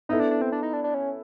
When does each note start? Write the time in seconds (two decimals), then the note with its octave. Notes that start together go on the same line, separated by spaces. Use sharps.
0.09 B3 D#4 E4 A4
0.20 D4
0.31 D4
0.42 C4
0.52 D4
0.63 D#4
0.73 D4
0.84 D4
0.94 C#4